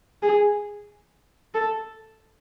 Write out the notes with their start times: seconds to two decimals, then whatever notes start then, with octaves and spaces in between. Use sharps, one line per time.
0.23 G#4
1.54 A4